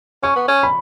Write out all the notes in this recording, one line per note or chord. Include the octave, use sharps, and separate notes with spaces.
C#4 C#6
B3
C#4
B5